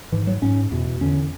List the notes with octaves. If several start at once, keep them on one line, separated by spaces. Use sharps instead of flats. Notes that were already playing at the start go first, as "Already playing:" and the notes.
G#2 E3
F#3
G#2 C#4
E2 B2
E2 D3 C#4